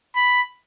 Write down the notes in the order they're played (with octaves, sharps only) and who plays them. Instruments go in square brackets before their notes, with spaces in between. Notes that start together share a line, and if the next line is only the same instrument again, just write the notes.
[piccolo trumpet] B5